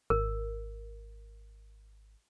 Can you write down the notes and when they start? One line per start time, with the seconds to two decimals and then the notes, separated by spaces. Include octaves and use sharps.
0.10 G#1 A#4